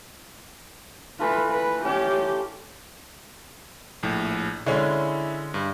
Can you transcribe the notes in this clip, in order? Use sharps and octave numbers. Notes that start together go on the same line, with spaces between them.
E3 A3 F4 B4
B4
C#4 G4 D5
A#1 A2
D3 G#3 C#4 E4
G2